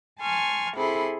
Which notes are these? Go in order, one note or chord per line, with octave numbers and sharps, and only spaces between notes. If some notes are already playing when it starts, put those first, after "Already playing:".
G#5 A5 C6 C#6 F6
C3 E4 G#4 A4 B5 C6